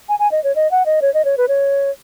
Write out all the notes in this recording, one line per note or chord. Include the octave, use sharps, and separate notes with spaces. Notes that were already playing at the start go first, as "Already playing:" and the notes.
G#5
G#5
D#5
C#5
D#5
F#5
D#5
C#5
D#5
C#5
B4
C#5